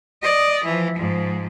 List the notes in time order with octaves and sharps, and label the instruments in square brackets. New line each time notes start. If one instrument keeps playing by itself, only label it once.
[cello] D5 D#5
E3 F3
G#2 F3